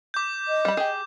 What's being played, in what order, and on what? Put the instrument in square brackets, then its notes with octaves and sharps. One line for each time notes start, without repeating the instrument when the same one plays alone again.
[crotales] D6 G6
[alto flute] D#5
[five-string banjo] G3 B5
G4 G#4